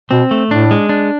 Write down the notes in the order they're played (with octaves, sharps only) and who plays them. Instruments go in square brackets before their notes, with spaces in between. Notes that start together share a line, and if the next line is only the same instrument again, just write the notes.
[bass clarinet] B2 [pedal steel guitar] C4
[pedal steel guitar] A3
[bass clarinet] A2 [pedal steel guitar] D4
[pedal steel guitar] G#3
D4